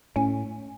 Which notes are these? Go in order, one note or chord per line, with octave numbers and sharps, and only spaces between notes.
A2 C#4